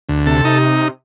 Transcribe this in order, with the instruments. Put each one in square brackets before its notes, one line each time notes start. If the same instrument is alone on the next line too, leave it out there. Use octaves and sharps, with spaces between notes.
[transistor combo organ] D2
[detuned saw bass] C3 [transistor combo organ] A4
[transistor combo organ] D#4